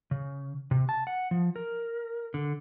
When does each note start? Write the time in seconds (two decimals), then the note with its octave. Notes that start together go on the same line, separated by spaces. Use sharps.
0.11 C#3
0.71 C3
0.89 A5
1.07 F#5
1.31 F3
1.56 A#4
2.34 D3